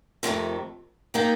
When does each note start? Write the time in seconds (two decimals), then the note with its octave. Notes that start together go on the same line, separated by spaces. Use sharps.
0.23 F2 C3 D#3 A3
1.14 D#3 A#3 D#4 G4